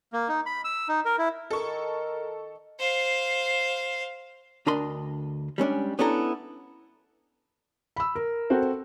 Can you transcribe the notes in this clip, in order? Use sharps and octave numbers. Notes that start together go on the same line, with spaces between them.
A#3
D#4
B5
E6
D#4
A#4
E4
D#3 A4 A#4 D#5 C#6
C5 F5
D2 D4 A#4 D#5 B5 C6
G3 G#3 C#4 D4
B3 C#4 D4 E4 A4 A#5
B5 E6
A#4
C4 F#4 A4